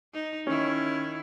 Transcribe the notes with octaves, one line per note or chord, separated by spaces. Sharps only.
D#4
D#3 C#4 E4